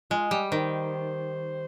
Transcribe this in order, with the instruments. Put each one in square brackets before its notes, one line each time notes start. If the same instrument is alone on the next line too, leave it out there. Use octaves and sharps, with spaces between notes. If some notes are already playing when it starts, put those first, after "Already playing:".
[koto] G#3 [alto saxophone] F4
[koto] G3 [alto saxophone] G4
[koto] D#3 [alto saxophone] C5